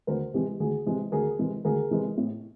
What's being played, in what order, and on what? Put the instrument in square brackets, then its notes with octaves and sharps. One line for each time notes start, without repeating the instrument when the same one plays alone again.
[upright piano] D2 A#4 C5
C3 E3 G#3 G4
D2 G#4
C3 E3 G#3
D2 G#4 A#4
C3 E3 G#3
D2 G#4 A#4
C3 E3 G#3
A2